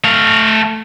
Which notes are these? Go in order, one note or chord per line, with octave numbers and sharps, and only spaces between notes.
A3 F5